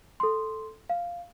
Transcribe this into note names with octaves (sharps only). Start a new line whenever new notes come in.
A4 C6
F5